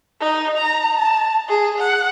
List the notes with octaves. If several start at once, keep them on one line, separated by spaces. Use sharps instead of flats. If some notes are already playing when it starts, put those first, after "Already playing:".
D#4
A#5
A5
G#4
F#5